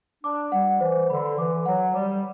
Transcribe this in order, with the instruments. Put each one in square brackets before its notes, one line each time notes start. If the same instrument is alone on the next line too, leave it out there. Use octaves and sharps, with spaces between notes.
[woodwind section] D4 [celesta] D6
[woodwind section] G3 [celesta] F#5
[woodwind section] E3 [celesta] C5
[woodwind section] D3 [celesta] B5
[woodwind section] E3 [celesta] D6
[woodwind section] F#3 [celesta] F#5
[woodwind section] G3 [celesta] D6